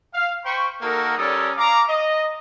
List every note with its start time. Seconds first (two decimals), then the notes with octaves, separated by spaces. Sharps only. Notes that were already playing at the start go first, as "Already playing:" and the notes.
0.14 F5
0.44 C5 G5 B5 C#6
0.81 A#3 D#4 F#4 A4 A#4
1.17 G3 C#4 A4 A#4 D5 D#6
1.57 F5 A#5 D6
1.87 D#5